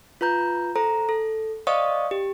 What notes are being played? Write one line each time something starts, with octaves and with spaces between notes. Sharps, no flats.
F4 B4 A#5 G6
A4 C5 A#5
A4
C5 D5 D#5 F5 C#6 D#6
G4